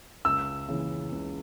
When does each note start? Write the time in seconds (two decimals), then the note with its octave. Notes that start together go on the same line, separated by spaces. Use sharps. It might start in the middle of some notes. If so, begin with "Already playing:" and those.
0.25 C#2 E6
0.68 C#3 E3
1.12 C#2